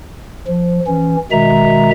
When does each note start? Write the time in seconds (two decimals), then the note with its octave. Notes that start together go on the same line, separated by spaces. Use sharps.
0.47 F3
0.87 E3 C#4
1.32 B2 D#3 G#3 E5 A#5